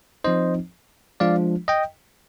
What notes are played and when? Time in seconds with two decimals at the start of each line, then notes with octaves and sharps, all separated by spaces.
0.24 F3 C4 D#4 C5 D#5
1.20 F3 G#3 D4 F4 D5 F5
1.68 D#5 G5